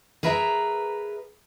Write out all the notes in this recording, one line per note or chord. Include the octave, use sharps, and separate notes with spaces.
G#4 A#4 B4 E5 A#5